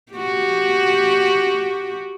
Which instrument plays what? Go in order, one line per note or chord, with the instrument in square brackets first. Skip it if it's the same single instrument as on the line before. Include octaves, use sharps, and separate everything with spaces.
[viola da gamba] F#4 G4